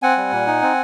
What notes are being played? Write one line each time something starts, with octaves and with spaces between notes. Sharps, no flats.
C4 F#5 G#5
G3
A#2
D#4
C4